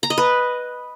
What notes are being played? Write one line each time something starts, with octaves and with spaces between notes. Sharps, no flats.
A#5
D#5
B4